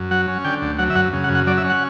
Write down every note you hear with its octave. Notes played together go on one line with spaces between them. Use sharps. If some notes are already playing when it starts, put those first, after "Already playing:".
Already playing: F#2
F#3 F#5
C#4
D3 G5
D2
F#3 F#5
E5
F#2 F#5
C#3
F#5
F#2
F#5
F#3 D5
E5
C#4
F#5